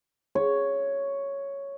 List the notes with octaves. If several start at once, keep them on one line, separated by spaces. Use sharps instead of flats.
C#5